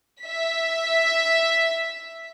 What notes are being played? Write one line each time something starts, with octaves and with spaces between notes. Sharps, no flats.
E5 B6